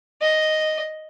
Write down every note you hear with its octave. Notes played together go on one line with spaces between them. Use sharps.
D#5